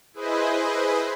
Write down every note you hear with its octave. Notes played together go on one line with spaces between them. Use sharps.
E4 G#4 B4 C5 D#5